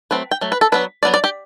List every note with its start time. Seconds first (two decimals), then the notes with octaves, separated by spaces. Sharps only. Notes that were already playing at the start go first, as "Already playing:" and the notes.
0.11 F#3 A3 C4 B4
0.31 G5
0.41 F#3 A3
0.52 B4
0.61 A4
0.72 F#3 B3 D4 B4
1.03 F#3 B3 D4 D5
1.14 D5
1.24 G4